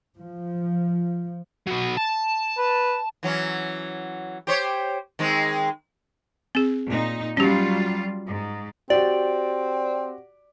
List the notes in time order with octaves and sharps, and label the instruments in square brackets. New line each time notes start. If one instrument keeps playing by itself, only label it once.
[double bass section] F3
[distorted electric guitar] F#3 B3
A5
[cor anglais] B4
[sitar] E3 F#3 C#4
G4 C5 C#5
D#3 G#3 C4
[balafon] C4 G#4
[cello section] A#2 D#4
[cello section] F#3 G3 F4 [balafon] C#4 G4
[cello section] G#2
[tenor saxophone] C4 [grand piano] F#4 G4 [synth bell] D5